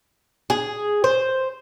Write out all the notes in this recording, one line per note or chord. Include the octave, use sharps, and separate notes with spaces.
G#4
C5